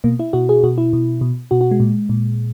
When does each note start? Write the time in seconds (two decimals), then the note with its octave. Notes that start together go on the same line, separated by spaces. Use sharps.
0.04 B2 A#3
0.19 E4
0.33 B2 F#4
0.49 G#4
0.64 B2 F#4
0.78 E4
0.93 B2
1.21 B2
1.51 B2 F#4
1.61 F#4
1.71 G#3
1.80 A#2
2.09 A#2